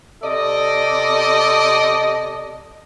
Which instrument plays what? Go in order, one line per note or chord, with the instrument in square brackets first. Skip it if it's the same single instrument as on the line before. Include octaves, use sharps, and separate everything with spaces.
[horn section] C3 A4 D5 D#5